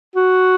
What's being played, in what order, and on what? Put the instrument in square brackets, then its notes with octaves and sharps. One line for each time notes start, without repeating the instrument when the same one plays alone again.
[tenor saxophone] F#4